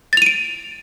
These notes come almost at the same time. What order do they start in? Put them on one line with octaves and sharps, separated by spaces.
A6 F7 D#7 D7